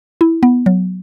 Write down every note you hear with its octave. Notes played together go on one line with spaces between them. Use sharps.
E4
B3
F#3